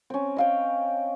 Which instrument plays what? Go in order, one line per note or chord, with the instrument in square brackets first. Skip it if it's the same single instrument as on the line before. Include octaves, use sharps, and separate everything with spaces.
[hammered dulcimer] C4 C#4
D#5 F5 G5